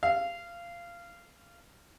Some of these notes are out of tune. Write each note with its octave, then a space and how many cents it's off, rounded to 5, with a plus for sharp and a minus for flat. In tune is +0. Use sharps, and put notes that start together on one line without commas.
F5 -20